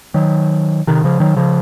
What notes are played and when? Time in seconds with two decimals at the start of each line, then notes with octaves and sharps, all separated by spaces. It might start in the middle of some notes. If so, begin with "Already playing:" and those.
0.14 D#3 F#3
0.87 C3 D#3
1.04 C#3 F3
1.20 D#3 F#3
1.36 C#3 F3